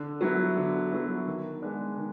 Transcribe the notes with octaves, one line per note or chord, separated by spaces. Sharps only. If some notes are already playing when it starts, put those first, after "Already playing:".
Already playing: D3
F#3 B3 E4
D3
F#3 B3 E4
D#3
G#3 B3 D4
D#3